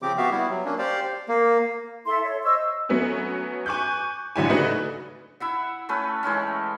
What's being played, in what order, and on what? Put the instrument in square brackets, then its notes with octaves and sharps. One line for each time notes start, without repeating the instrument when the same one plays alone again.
[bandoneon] C#3 F3 C4 G4 D6
B3 F#4 E5 F5
G3 B3 E4
F#3
A#3 C#4 D4
G4 C5 D5 F5
A#3
[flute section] E4 A4 E5 C6
C#5
C5 D#5 C#6 E6
[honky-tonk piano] F#3 A3 B3 C#4 F#4
G#5 C#6 D6 F#6 G6
A1 D3 F#3 E4 G4 G#5
C#3 A3 D4 D#4 F#4 B4
[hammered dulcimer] E4 E5 F#5
A3 C#4 B4
E3 G#3 A3 C#4